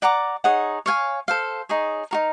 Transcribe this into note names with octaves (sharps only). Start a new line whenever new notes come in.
D5 F#5 A#5 D6
D#4 G#4 C#5 F#5
C#5 F5 G#5
A4 C5 F5
D#4 G#4 C#5
D#4 F#4 A#4